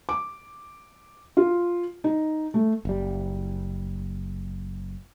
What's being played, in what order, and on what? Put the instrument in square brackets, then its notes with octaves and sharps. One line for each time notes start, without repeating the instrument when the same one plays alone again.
[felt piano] D6
F4
D#4
A3
[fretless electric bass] F#1 G3